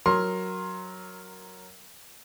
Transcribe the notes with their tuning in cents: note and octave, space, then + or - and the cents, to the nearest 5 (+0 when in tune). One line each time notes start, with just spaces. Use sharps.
F#3 +0 A#4 +0 C6 +15